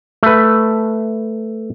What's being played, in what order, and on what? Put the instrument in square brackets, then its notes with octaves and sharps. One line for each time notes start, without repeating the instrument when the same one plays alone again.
[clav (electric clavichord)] A3 B4